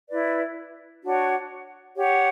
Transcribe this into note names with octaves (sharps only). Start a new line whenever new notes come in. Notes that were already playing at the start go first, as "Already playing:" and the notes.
E4 B4 D5
D4 F#4 C#5 F#5
G4 C#5 F#5